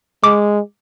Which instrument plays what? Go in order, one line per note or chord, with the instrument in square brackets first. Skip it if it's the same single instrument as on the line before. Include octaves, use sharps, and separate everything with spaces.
[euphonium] G#3 [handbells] D6